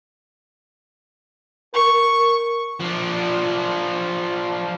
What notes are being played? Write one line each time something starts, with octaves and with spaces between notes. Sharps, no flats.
A#4 C#6
F3 D4